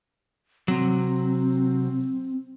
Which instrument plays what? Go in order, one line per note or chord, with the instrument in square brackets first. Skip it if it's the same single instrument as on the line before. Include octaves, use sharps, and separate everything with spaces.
[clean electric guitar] C3 F#3 [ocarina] C4